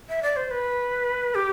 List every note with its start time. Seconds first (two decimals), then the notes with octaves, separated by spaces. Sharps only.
0.09 E5
0.23 D5
0.36 C5
0.51 B4
1.35 G4